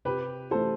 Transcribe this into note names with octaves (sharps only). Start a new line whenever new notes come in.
C3 G4 B4
E3 A3 A4 C5